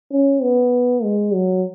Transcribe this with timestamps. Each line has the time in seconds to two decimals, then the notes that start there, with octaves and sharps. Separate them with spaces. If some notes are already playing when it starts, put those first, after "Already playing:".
0.12 C#4
0.42 B3
1.03 G#3
1.33 F#3